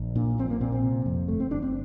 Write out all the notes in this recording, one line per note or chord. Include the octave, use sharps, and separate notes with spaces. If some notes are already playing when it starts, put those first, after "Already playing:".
Already playing: A#1
A#2 D4
A#1 C4
A#3
A#2 C4
C4
C3
F2
G1 A3
C4
G1 D4
C4